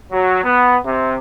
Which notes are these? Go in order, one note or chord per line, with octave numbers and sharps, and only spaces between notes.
F#3
B3
C3